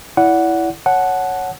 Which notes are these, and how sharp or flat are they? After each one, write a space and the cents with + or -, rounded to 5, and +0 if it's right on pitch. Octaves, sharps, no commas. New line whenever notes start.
E4 +0 D5 -40 F#5 +0
C#5 +0 F#5 +0 A5 -20